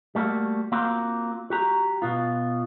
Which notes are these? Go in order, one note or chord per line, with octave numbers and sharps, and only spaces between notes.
G3 A3 A#3 F#4
A#3 C4 F4 F#4
F#4 G4 A#5
B2 B3 F4